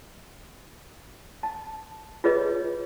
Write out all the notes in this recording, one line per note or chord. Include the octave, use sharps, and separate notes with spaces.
A5
F4 G#4 B4 C#5 D#5